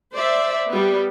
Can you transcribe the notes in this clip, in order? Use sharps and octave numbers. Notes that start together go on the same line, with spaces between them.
C5 D5 E5
G3 B3